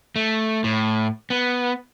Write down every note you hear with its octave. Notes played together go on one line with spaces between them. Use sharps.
A3
A2
B3